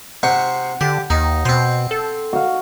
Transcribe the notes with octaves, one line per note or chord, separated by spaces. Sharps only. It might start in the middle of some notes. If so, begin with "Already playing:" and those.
C3 C5 F#5 C#6
D3 G4
D#2 D#4
B2 C4 C5
A4
F#4 F5